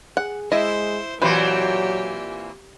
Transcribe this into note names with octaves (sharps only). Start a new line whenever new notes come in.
G#4 F#5
G#3 E4 C5 D#5
A#2 E3 F#3 C4 G4 B4 C5